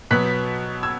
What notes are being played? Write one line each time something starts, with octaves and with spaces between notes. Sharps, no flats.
B2 F#3 B3 F#6 B6
E6 G#6